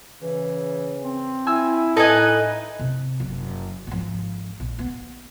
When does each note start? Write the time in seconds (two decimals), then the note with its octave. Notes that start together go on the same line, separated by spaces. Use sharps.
0.22 C#3 E3
1.03 C4
1.47 E4 G#5 E6
1.97 A2 D#4 A4 B4 D#5 G#5
2.79 C3
3.20 F#1
3.87 G#1 F3
4.60 A#1
4.79 B3